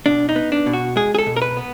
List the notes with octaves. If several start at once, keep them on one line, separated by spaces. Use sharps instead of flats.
B2 D4
D#4
B3
D4
B2
F#4
G#3 G#4
G#4
A4
B2
A#4
B4
B3